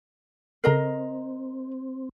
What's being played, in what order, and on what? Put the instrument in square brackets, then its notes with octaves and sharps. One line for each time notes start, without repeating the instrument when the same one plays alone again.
[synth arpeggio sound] C#3 A4 C7 [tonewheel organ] C4 [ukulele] A#4 D#5 A#5